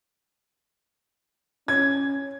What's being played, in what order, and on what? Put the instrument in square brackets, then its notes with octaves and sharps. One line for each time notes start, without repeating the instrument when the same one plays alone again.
[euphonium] C#4 [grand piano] G#6